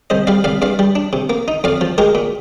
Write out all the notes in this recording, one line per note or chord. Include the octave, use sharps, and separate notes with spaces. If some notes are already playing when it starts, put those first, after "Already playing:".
C2 C5 D#5
G3 D5 F5
C2 D5 F5
G2 D5 F5
G3
D4
C3
A#3
D#4
F2 D5 F5
F3
G#3 G4 A#4
A#2